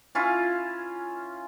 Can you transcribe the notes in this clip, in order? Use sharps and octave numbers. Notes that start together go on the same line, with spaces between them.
C#4 E4 F4